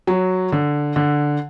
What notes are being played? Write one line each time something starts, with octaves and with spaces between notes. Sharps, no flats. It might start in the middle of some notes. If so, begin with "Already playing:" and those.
F#3
D3
D3